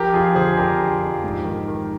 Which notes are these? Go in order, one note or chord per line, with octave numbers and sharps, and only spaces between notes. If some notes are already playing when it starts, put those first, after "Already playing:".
Already playing: F3 G4 A#4
F2 F4 G#4
D3 G#4 C5
F2 G4 A#4
F3
F2
G#2
D#3
D#3